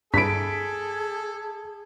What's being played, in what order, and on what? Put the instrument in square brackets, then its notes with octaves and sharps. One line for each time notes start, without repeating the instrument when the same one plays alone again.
[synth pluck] G2 D4 E4 [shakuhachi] G#4 [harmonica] A4 [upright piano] B6 D7